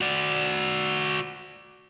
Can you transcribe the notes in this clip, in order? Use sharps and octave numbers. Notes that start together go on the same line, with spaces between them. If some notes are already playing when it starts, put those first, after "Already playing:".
F#4 D5